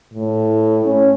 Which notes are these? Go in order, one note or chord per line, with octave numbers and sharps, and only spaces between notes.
A2
C#4